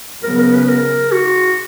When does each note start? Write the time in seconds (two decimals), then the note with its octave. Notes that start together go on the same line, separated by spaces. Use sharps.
0.24 C#3 F#3 B3 A#4
0.39 A#4
0.54 B4
0.68 A#4
1.12 F#4